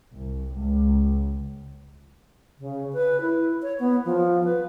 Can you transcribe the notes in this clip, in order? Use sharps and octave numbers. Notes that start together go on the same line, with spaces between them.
C2
C#2
C#3
B4
E4
C#5
B3
F3
B4